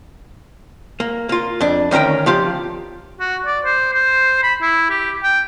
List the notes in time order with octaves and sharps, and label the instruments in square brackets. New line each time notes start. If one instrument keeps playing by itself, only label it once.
[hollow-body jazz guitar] A#3
A#3 F4
F2 D4
D2 D#3 C#4 A#4 G5
F3 F4 G4
[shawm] F#4
D5
C5
C5
B5
E4
G4
G5